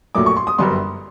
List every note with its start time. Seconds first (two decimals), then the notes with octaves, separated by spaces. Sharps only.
0.15 A#1 A#2 F#3 A3 D6
0.26 C#6
0.37 C6
0.47 D#6
0.58 G1 F#2 D3 G3 C6